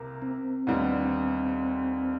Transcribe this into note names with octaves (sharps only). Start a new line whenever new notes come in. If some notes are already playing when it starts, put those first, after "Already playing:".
Already playing: C2 C3 A#3
C4
D#2 D3 G3 B3